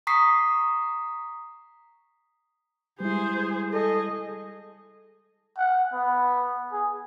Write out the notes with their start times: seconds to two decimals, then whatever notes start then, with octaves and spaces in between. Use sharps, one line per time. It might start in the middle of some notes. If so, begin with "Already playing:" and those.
0.07 A#5 C#6 D#6 B6 C7
3.00 G3 G#3 E4 G#4 C5
3.73 G#4 A4 D#5
5.57 F#5
5.93 B3
6.72 G#4